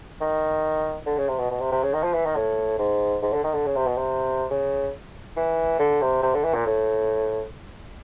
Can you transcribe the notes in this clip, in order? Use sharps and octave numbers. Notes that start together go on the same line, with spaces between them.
D#3
D3
C#3
C3
B2
B2
C3
C3
C#3
D#3
F3
E3
D#3
A2
G#2
G#2
D3
D#3
D3
C#3
C3
B2
C3
C#3
E3
D3
C3
C3
D3
E3
A#2
A2